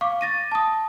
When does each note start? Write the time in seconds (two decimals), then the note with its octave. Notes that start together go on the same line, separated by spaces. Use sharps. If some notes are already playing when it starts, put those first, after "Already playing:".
0.01 F5 C#6 D6
0.21 A6 A#6 D#7
0.52 A5 D#6